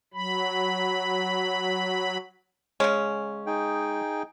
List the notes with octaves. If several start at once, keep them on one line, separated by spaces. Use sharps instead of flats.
F#3 B5
C#3 G#3 C#4
D#4 G#4 G5